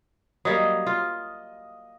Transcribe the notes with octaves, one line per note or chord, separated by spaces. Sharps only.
F#3 G3 A#3 D#5
F4